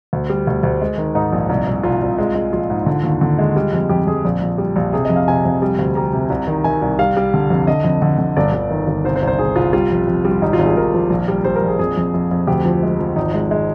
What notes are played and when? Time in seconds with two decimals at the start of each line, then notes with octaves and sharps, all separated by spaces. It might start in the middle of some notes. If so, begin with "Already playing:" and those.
0.13 D2
0.30 G3
0.47 D2
0.63 D2
0.81 G#3
0.98 D#3
1.15 G#2 D#4
1.32 A#1
1.49 C2
1.67 C2
1.83 C2 F4
2.02 C2
2.18 G#3
2.35 G#3
2.53 A#1 F4
2.70 G#2
2.86 D3
3.04 D#2
3.21 D3
3.38 G#3
3.56 G3
3.73 F2
3.89 F2 G4
4.07 F2 G#4
4.25 A#1
4.41 A#1
4.58 G3
4.76 A#1
4.93 C3 G#4
5.05 F2 D#5
5.16 F5
5.28 C3 G#5
5.45 F2
5.62 G3
5.79 D2
5.95 G3 A#5
6.13 C3
6.30 C2
6.47 D#3
6.64 D#3 G#5
6.82 C2
6.99 G3 F5
7.17 G3
7.34 D3
7.50 F2
7.67 D3 D#5
7.84 F2
8.02 D3
8.18 D3
8.37 G1 D5
8.53 G1
8.70 D#3
8.88 G1
9.04 C2 C5
9.16 C5
9.23 C2
9.28 C5
9.38 C2 G#4
9.56 C2 F4
9.73 G3 F4
9.91 F2
10.08 F2
10.25 G3
10.31 F4
10.42 G#1 D#4
10.53 F4
10.59 G#1
10.66 G#4
10.76 G#1 A#4
10.94 F3
11.10 A#1
11.28 G3
11.44 G3 C5
11.56 A#4
11.62 A#1
11.68 G#4
11.79 F2 G#4
11.97 F2
12.14 F2
12.31 F2
12.47 D2 G4
12.65 F3
12.83 G#3
12.99 F3
13.16 G#1 D#4
13.34 G#3
13.51 G#3